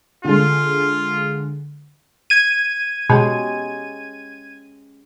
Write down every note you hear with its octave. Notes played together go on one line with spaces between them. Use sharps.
D3 G#3 F4
G#6 D#7
B2 G#3 C#4 G4